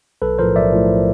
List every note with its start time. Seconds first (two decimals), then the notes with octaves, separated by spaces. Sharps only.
0.22 B1 A4 B4
0.39 A2 F3 A#4 C5
0.56 B1 D5 E5
0.73 A2 F3